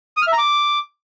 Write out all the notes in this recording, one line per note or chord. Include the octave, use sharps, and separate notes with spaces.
D#6
F6
E5
A#5
D6